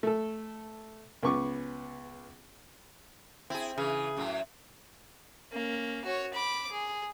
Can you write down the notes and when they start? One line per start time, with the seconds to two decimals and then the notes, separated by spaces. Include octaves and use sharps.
0.03 A3 A4
1.23 C#2 B3 C#6 D6
3.50 C4 E4 G#4
3.78 C#3 E3 G#4
4.17 F#2 A2 F#3
5.52 A#3 C#4
6.05 F#4 C#5
6.34 B5 D6
6.72 G#4